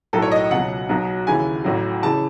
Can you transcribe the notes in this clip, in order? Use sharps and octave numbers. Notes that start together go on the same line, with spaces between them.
B1 A2 F#3 A4
C#5
D#5
C#2 B2 F#3 F#5
B1 B2 F#3
D#2 C#3 E3 G#5
A1 A2 F#3
C#3 E3 A5